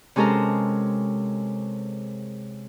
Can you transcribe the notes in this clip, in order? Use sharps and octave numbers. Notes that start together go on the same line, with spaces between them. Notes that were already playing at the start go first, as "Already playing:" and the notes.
C3 G#3 C#4 A4 A#4 A#5